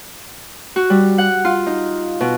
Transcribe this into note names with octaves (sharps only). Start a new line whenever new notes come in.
F#4
G3
F#5
F4
D#4
B2